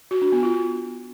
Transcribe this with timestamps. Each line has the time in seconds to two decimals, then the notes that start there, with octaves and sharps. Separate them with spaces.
0.11 F#4
0.22 D4
0.32 B3
0.43 F4